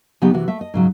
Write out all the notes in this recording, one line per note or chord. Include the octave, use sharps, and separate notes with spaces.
C#3 F#3 B3 D#4 G4
C3 E3 F#4
A3 E5
D#5
G#2 C#3 F#3